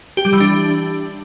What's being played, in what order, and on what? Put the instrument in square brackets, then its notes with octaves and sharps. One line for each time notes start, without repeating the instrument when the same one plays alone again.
[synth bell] G4
G3
E3
D4